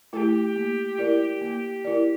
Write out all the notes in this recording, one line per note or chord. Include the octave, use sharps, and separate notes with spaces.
A3 E4 G4 A4
A#3
E4 A#4 D5
A#3
E4 A#4 D5